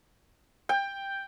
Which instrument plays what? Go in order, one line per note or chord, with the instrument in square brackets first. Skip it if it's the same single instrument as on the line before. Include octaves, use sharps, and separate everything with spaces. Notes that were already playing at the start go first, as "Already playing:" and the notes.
[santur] G5